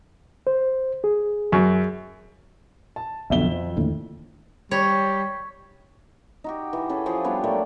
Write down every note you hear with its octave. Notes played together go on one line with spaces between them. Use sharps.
C5
G#4
F#2
A5
B1 F2 B2 D3 E5 G7
F3
D#2 A2 D3
G3 C#5
D#4 F#4 G4
E3
C#4 G#4 A4 B4
F3 F4 G4 G#4
G3 B3 D4 F4
F#3 A3 A#3 D5